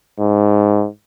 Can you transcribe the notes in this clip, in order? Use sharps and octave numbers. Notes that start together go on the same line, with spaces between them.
G#2